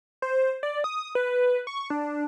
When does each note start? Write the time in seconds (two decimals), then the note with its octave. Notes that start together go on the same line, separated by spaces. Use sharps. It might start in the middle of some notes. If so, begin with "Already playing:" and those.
0.22 C5
0.63 D5
0.84 D#6
1.15 B4
1.67 C#6
1.90 D4